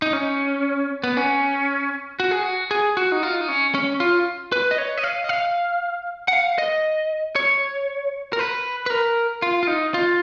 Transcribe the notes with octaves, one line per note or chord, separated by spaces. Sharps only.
D#4
C#4
B3
C#4
F#4
G#4
F#4
G#4
F#4
D#4
F4
D#4
C#4
C#4
F4
B4
D#5
C#5
D#5
F5
D#5
F5
F#5
F5
D#5
C#5
A#4
B4
B4
A#4
F4
F4
D#4
F4